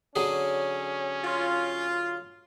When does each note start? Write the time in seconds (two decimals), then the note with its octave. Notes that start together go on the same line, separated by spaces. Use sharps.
0.16 D3 F#3 C#4 G#4
1.24 F4